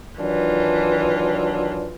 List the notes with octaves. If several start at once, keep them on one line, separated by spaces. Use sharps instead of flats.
D#3 E3 F#3 D4 F4